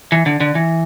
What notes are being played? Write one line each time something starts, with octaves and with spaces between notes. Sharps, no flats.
E3
D3
D3
E3